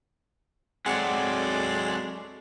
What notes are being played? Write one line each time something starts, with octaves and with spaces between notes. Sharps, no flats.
F#3 G#3 C4 A4 D5 F#5